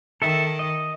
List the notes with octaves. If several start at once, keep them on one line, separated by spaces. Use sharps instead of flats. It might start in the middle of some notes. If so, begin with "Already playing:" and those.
D#3 A4 E5
D#5